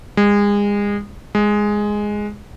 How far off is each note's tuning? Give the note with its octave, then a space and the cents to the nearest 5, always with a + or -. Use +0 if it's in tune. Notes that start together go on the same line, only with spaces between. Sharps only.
G#3 -30
G#3 +0